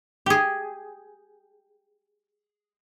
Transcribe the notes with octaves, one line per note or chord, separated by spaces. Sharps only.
G4 G#4